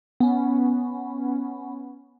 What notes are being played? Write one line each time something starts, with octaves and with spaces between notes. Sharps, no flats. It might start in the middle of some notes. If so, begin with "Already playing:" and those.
B3 C#4